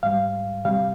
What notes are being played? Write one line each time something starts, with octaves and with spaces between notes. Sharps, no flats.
G#2 G3 F5
D2 C3 G3 F5